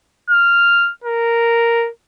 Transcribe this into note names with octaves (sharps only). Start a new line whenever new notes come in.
F6
A#4